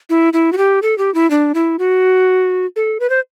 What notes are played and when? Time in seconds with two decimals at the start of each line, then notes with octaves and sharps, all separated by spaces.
0.10 E4
0.33 E4
0.52 F#4
0.58 G4
0.82 A4
0.98 G4
1.14 E4
1.30 D4
1.55 E4
1.79 F#4
2.76 A4
3.00 B4
3.10 C5